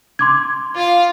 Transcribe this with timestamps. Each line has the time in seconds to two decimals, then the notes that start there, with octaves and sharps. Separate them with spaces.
0.19 C6 D6 G#6
0.75 F4 F5